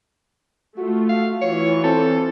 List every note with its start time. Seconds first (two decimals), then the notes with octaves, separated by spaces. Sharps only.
0.78 A3 F4 F#4
1.09 F5
1.42 E3 F4 C#5
1.84 C4 A4